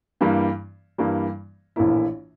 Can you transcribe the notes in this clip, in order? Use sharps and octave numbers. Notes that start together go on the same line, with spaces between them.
G2 E3 G3 A#3
G2 E3 G3 A#3
A#1 A2 E3 A#3 E4